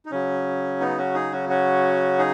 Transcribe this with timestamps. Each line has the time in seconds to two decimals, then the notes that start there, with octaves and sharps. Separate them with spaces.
0.06 D#4
0.11 C#3 F#3 C#4
0.80 B3 D#4
0.97 C#4 F#4
1.14 D#4 G#4
1.32 C#4 F#4
1.49 C#4 F#4
2.19 D#4 G#4